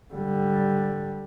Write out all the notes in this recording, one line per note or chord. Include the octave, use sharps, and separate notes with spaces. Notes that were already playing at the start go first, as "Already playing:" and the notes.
D3 G3